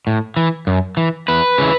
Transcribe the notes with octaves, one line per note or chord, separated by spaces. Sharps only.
A2
E3
F#2
E3
E2 B4
C#3 E3